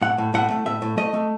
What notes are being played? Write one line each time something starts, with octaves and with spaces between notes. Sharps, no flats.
A2 F#5
A2
A2 F#5
A3
A2 E5
A2
A3 D#5
A3